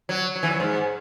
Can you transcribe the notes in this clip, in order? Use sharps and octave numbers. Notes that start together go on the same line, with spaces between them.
F#3
F#3
E3
F#3
G#2